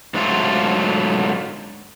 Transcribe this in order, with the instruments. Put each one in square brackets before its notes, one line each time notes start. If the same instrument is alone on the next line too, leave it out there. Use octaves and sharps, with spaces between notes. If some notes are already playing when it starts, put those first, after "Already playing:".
[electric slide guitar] G#2 D3 F#3 A3 F4